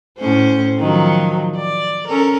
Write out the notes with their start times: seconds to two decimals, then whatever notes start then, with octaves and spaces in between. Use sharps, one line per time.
0.18 A2 C#4 C5
0.79 D#3 F3 F#3
1.56 D5
2.08 C#4 A4 A#4